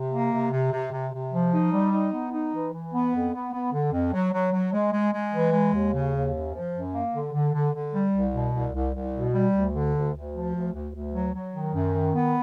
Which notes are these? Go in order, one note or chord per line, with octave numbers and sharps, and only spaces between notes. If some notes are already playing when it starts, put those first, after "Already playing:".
Already playing: C3
A#3
C3
C3
C3
C3
C3
F3
D#4
G3
D#4
B3
D#4
E3
E3
B3
F2
B3
B3
D3
F2
F#3
F#3
F#3
G#3
G#3
G#3
E3
G#3
D#2
C#3
D#2
F#2
F3
F#2
A#3
D3
D3
D3
D3
G3
C2
B2
C2
C2
C2
B2
G3
D2
D3
D2
D2
F3
D2
D2
D2
F#3
F#3
D#3
F#2
D#3
B3